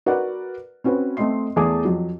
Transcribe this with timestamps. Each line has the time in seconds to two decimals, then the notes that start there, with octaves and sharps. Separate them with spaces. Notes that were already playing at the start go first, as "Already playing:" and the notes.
0.06 F#4 A#4 B4 D5 F#5
0.84 C4 C#4 F#4 B4 C5
1.17 A3 C4 D#5 C6 C7
1.56 E2 A3 G#4 G#5 A5 D6
1.85 F2 F#3